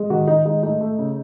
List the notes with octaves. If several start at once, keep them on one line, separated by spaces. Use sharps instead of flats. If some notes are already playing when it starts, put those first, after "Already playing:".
Already playing: G#3
D#3 F#4
D#3 D#4
G#3 D#4
A3 D#4
A3
C#3